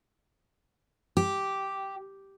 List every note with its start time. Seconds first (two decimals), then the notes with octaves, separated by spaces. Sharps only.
1.17 G4